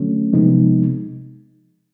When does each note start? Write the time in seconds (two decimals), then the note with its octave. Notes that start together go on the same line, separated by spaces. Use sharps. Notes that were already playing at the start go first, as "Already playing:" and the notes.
Already playing: D3 F#3 A3 C#4
0.33 C3 F3 G#3 B3 D#4